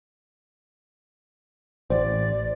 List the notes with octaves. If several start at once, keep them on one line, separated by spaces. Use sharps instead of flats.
A1 C5 D5